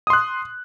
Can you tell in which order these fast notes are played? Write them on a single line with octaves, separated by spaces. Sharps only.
D#6 C6 F#6